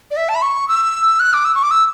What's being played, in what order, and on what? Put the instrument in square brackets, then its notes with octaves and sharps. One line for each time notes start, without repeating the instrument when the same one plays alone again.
[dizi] D5
E5
A5
B5
C#6
E6
F#6
D6
E6
C#6
D6
E6